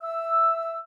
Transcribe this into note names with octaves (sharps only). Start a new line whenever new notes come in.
E5 E6